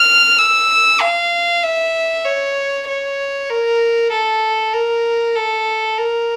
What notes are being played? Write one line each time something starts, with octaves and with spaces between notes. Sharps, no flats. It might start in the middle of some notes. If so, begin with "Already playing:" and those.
Already playing: F6
E6
F5
E5
C#5
C#5
A#4
A4
A#4
A4
A#4